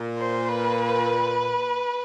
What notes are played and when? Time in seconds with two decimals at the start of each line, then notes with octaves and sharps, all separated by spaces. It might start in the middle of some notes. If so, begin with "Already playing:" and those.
Already playing: A#2
0.18 C5
0.48 B4